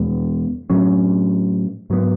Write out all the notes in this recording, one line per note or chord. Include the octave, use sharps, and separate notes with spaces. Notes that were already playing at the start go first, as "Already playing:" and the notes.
Already playing: E2 B2 G#3 B3
A2 F#3 C#4
G#2 F#3 B3